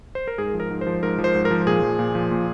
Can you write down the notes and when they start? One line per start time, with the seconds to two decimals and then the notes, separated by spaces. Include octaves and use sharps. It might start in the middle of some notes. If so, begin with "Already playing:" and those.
0.15 C5
0.28 A#4
0.38 G#2 G#4
0.54 F3
0.60 A#4
0.70 G#2
0.81 C5
0.87 F3
1.03 G#2 A#4
1.18 F3
1.24 C5
1.35 G#2
1.45 A#4
1.51 F3
1.67 A#2 G#4
1.82 F3
1.99 A#2
2.15 F3
2.31 A#2